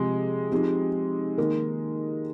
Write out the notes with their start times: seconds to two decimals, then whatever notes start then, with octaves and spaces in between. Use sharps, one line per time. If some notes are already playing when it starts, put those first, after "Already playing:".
Already playing: C3 F3 G#3 C4 G4
0.51 F3 C4 D#4 G4
1.38 D#3 A#3 D#4 A#4